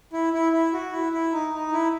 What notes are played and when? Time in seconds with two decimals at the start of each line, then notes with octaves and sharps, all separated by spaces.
0.13 E4
0.33 E4
0.52 E4
0.73 F#4
0.92 E4
1.12 E4
1.32 D#4
1.53 D#4
1.73 E4